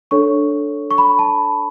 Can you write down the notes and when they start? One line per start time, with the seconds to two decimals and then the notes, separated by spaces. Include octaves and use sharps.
0.11 D4 A4 C#5 C#6
0.91 C#6
0.98 B5
1.19 A5